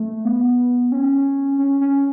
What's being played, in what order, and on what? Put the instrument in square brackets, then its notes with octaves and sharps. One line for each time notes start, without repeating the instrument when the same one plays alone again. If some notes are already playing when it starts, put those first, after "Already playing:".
Already playing: [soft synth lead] A3
B3
C#4
C#4
C#4